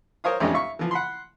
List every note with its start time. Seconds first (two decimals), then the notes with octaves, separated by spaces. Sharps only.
0.24 A#4 C5 C#5 F5 D#6
0.40 A1 F2 G#3 C#4 D4 G4
0.54 E5 F5 C#6
0.79 E3 F3
0.91 F#5 B5 C6